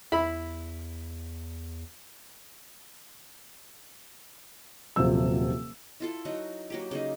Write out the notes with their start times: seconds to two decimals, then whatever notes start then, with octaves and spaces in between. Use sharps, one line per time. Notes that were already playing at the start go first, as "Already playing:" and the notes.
0.12 E2 E4 B5
4.96 D#1 C3 F3 F#3 E6
6.00 E4 F4 A4
6.25 F#3 D#4 F#4
6.70 F#3 A#3 G4
6.91 C#3 A#3 D#4